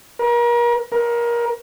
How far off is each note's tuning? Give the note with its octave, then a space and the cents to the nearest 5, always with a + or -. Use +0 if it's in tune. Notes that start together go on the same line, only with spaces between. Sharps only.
A#4 +35
A#4 +20